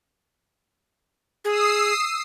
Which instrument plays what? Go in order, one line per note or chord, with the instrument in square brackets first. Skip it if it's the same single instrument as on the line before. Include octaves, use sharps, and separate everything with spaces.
[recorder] G#4 [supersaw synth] D#6 E6 C7